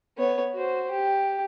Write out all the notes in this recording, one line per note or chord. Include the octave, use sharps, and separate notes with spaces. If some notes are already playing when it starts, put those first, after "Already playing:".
B3 C#5
F#4 C5
G4